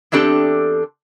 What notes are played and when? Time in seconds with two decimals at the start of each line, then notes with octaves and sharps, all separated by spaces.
0.12 E2 C4 D4 G4 A4